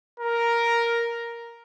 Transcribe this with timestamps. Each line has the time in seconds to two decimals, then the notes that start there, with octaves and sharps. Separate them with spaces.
0.20 A#4